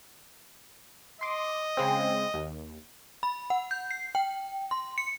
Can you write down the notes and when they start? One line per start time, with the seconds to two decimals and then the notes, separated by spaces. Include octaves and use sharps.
1.21 D#5 C6 D6
1.77 C#3 G#3 C4
2.34 D#2
3.23 B5
3.50 F#5
3.71 G6
3.91 C7
4.15 G5
4.71 C6
4.98 C#7